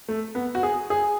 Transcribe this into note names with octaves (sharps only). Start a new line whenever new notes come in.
A3
B3
F#4
G#4
G#4